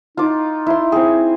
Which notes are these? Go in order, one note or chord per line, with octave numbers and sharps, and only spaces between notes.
D#4 F4 D6
E4 C6
C4 G#4